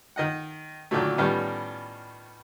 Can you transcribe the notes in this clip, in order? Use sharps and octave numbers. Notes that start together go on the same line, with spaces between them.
D#3 D#5 F#5
A#2 D3 D#3 F#3 A3
A2 D#3 G3 B3 C#4 F4